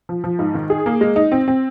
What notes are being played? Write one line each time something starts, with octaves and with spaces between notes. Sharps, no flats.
F3
F3
G#2
D#3
G#4
A#3
G#3
D#4
C4
C4